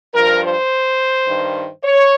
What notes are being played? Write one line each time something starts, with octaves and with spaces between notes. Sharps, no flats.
G2 F3 A#4
C5
G2 D#3
C#5